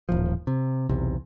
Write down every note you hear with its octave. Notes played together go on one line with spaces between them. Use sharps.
D#1 A1 F3
C3
B1 E2 C3